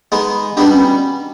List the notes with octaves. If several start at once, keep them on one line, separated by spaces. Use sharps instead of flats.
G#3 B3 D#4
B2 G3 B3 D4 D#4 G4
C#4